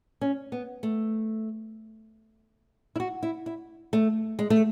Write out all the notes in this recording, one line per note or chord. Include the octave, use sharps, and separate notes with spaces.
C#4
B3
A3
E4
F#4
E4
E4
A3
G#3
A3